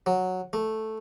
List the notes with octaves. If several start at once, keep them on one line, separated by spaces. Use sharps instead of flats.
F#3
A3